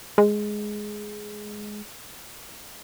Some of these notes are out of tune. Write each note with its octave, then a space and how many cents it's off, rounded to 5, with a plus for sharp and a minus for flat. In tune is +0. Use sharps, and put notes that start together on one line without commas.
G#3 +10